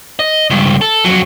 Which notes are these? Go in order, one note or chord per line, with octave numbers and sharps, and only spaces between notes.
D#5
C#2 G2
A4
F2 F#3